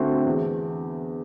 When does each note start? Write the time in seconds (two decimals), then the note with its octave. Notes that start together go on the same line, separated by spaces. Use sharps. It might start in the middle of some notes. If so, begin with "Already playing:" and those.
Already playing: D3 A3 C4 F#4
0.26 E2